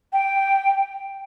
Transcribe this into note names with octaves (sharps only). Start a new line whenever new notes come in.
G5